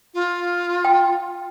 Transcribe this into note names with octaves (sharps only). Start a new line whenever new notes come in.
F4
G5